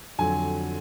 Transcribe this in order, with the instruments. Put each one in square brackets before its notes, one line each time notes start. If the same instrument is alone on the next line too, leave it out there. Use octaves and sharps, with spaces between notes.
[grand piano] F2 D3 F#3 [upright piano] G#5